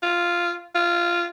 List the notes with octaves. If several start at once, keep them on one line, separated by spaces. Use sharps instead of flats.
F4
F4